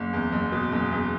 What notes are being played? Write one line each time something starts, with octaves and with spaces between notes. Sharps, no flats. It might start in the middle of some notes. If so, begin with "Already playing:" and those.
Already playing: F#1
E2
F#1
B2
F#1
E2